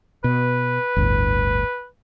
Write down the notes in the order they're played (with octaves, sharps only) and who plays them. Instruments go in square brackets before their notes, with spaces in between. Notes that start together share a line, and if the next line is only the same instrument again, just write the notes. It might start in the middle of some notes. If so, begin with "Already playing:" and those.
[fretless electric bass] B2 [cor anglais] B4
[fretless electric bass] G1 D2 A2